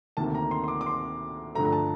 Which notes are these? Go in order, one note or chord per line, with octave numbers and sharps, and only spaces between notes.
D2 C3 D#3 A#3 A5
A#5
C6
C6
D6
D6
C6
G2 D3 F3 A3 A#5
A#5
A5